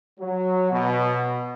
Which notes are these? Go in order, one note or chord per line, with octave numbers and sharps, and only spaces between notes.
F#3
B2